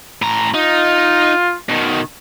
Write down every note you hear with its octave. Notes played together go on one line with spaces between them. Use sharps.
A2 A#5
D#4 F4
B2 D#3